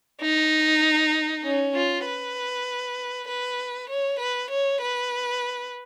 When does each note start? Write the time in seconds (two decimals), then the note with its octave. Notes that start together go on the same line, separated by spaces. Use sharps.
0.21 D#4
1.44 C#4
1.75 F4
2.05 B4
3.28 B4
3.89 C#5
4.19 B4
4.50 C#5
4.81 B4